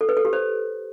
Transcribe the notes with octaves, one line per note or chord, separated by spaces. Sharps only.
A4
B4
A4
G4
C5